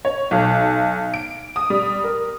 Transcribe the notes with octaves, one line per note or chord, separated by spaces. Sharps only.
C#5
B1
D7
D#6
G3
A#4